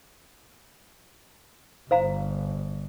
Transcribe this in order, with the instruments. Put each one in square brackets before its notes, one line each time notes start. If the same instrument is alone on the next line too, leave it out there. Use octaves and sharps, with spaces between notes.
[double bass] G1 [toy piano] C5 F5 A#5